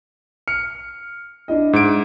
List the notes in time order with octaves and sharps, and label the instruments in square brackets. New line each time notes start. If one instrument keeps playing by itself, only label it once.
[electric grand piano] F6 [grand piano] C#7
[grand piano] D4 E4 D#5
[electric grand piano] G#2 D7